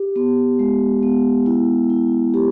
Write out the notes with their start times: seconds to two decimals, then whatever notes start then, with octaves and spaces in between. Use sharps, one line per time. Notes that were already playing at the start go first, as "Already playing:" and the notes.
Already playing: G4
0.16 B3
0.59 G#3
1.03 B3
1.46 E4
1.90 E4
2.34 G4